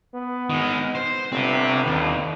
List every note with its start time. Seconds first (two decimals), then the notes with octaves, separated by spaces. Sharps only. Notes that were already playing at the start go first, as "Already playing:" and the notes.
0.14 B3
0.50 D#3 G#3
0.95 C5
1.32 G1 C3 C4
1.87 D#2